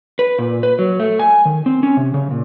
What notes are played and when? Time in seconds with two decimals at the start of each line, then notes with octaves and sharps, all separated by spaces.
0.19 B4
0.39 A#2
0.63 B4
0.79 F#3
1.00 A3
1.19 G#5
1.45 D#3
1.66 C4
1.83 C#4
1.97 C3
2.14 C#3
2.31 A#2